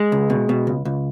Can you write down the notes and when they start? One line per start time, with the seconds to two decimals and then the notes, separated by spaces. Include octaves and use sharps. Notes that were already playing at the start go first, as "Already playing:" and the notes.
Already playing: G#3
0.12 C#2
0.30 B2
0.49 B2
0.67 C#2
0.85 C#2